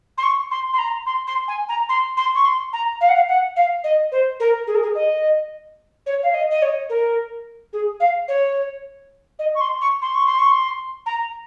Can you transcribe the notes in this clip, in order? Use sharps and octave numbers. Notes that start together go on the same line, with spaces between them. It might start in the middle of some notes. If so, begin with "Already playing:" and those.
C6
C#6
C6
C6
A#5
C6
C6
G#5
A#5
C6
C6
C#6
C6
A#5
F5
F#5
F5
F#5
F5
D#5
C5
A#4
G#4
A#4
G#4
D#5
C#5
F5
D#5
D#5
C#5
A#4
G#4
F5
C#5
D#5
C#6
C6
C#6
C6
C#6
C6
C#6
C6
A#5